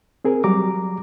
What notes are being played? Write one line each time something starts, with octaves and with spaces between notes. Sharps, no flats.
C4 G#4 A#4
F#3 G3 A#5 D6